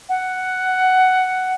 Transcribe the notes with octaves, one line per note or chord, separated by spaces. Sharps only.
F#5